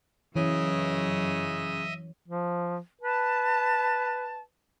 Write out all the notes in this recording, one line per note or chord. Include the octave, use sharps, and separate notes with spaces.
F#2 C#3 E3 C#5 D#5 E5 D#6
F3
B4 A5